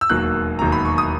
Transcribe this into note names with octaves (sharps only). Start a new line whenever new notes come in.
E6
E1 D#2 D#3 F#3 A#3 F#6
E1 D#2 D#3 F#3 A#5
B5
C#6
D#6